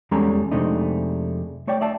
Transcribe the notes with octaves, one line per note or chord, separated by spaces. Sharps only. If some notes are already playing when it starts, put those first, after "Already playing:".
E2 G3 G#3 C#4 A4 A#5
F2 C3 G#3 A3 D4 D#4
A3 C#5 D5 G5
D5 E5 A5